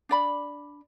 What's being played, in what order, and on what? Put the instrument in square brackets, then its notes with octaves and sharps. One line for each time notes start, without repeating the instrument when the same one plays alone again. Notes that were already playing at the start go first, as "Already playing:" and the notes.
[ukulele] D4 D5 B5